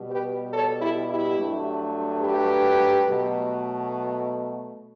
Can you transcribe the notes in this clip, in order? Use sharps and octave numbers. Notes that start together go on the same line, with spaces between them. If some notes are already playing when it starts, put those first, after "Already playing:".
Already playing: B2 G3
G4 B4
A4 C#5
E4 G4
E4 G4
G2 F#3 A3
G4 B4
B2 F#3 A3